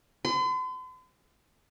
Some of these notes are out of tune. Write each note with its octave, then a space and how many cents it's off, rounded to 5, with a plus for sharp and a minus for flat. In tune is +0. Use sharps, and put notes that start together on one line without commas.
C6 -45